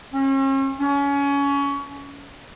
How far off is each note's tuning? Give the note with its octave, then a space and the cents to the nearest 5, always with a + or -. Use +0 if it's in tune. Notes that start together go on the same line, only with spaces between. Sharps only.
C#4 -40
C#4 +25